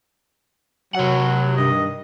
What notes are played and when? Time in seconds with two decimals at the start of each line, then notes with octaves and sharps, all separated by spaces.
0.95 C3 F#3 F#5
1.56 G2 D#3 D#5